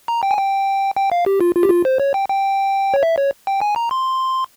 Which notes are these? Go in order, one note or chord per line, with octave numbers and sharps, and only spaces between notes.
A#5
G5
G#5
G5
G5
F5
G4
F4
F4
G4
F4
C5
C#5
G5
G5
C#5
E5
C#5
G5
G#5
A#5
C6